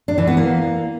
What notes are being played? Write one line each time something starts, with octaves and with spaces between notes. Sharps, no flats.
D4
E3
B3
A#3